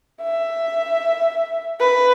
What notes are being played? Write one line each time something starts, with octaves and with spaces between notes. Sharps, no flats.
E5
B4